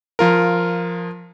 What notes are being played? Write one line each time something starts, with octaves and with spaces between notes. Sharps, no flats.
F3 F4 A#4